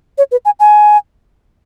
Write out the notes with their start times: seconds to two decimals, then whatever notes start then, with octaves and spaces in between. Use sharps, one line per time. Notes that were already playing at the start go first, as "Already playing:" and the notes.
0.18 C#5
0.31 B4
0.45 G#5
0.60 G#5